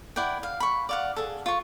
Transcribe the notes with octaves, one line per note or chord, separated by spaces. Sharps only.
E4 D5 F#5 G5
F5
B5 C#6
D5 F5 F#5
G#4 A4
F4 C#6